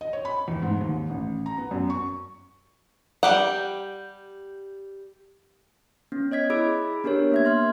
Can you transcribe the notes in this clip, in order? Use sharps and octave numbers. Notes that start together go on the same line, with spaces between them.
D#5
C#5
B5
E2
G#2
D#2
A1
A#5
B3
F#2
C#6
G3 G4 F#5
B3 C#4
C#5 D#5 G#6 B6
E4 G#4 B5 D6 E6 D7
B3 D4 G4 A#4 C#5
A#3 E5 G#6
E5 C6 F6